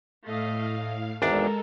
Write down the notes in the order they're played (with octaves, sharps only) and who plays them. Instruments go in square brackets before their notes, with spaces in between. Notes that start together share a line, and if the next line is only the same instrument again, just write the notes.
[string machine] A2 F5 [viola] A3 D#5
[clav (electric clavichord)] G#1 E2 D4 [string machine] G#3 A4 [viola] A#4